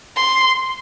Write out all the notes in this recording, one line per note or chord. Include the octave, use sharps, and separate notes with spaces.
C6